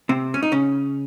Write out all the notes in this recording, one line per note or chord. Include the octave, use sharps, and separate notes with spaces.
C3 C4
C#4
D#4
C#3 C#4